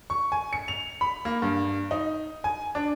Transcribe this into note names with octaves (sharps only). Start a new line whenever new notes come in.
C#6
G#5
C#7
F7
B5
A#3
G2
D#4
G#5
D4